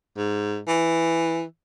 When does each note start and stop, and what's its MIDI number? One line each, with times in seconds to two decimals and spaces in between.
0.17 0.60 44
0.68 1.43 52